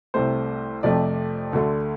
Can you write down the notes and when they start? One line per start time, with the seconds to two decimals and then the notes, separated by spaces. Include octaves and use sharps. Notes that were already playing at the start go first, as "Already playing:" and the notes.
0.14 C2 C3 A3 C5
0.83 F2 C3 F3 A3 D5
1.53 D2 D3 A3